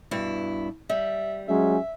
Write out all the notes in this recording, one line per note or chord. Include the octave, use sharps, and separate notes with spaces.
G2 B2 E4
G3 E5
F#3 G#3 C#4 E5